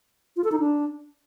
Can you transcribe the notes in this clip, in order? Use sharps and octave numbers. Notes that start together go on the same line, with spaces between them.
F4
A4
D#4
D4